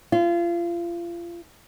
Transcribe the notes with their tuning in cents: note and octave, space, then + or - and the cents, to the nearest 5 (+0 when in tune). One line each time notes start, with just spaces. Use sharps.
F4 -30